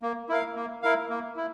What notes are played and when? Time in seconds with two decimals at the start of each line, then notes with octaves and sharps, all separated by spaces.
0.02 A#3
0.29 E4 A#4 F5
0.56 A#3
0.82 E4 A#4 F5
1.09 A#3
1.36 E4